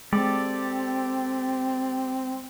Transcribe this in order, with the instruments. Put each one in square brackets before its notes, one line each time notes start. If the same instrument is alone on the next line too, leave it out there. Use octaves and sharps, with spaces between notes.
[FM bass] G#3 [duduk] C4 [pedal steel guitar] G4 A4 D5